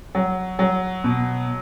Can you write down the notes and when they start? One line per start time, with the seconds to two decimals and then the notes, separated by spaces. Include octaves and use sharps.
0.15 F#3
0.59 F#3
1.04 B2